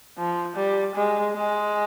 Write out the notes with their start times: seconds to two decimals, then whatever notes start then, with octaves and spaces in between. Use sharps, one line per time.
0.18 F3
0.56 G3
0.95 G#3
1.35 G#3